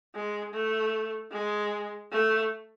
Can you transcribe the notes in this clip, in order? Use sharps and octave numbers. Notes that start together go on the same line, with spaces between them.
G#3
A3
G#3
A3